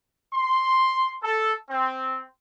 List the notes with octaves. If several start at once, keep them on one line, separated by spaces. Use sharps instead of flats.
C6
A4
C4